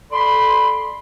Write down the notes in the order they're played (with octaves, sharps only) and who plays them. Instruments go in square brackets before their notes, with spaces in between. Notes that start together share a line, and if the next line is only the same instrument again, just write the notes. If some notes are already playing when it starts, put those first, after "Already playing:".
[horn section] A4 D5 B5 [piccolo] C6